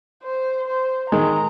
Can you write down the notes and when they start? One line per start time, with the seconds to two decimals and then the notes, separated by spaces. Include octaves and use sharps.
0.23 C5
0.68 C5
1.12 D#3 G#3 A#5